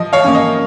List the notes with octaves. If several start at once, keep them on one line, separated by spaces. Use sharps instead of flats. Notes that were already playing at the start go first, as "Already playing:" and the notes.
Already playing: F3 D#5
C#5 F5
A#3 C#4
D#5